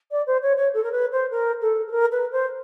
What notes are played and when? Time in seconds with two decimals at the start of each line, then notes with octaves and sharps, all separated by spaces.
0.11 D5
0.27 C5
0.42 C#5
0.57 C#5
0.74 A4
0.83 A#4
0.92 B4
1.12 C5
1.31 A#4
1.62 A4
1.87 A4
1.91 A#4
2.12 B4
2.32 C5